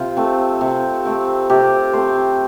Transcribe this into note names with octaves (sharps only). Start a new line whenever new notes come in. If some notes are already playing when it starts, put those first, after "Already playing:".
Already playing: C3 F4
A3 C4
C3
A3 C4
C3 G4
A3 C4 C5